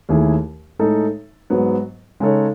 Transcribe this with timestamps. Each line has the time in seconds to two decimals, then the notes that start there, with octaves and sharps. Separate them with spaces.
0.09 D#2 D#3 A3 E4 G#4
0.79 A2 G#3 D#4 A4
1.50 G#2 F#3 B3
2.20 C#3 G#3 D#4 A4 C#5